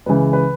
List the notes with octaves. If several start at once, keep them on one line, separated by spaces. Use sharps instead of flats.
C#2 C#3 E3 B4
B4